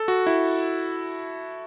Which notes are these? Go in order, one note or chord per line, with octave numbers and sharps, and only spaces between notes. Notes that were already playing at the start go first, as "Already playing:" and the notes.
Already playing: A4
F#4
E4